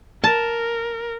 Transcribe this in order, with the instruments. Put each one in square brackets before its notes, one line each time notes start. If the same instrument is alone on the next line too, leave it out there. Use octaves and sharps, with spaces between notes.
[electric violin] A#4 [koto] A5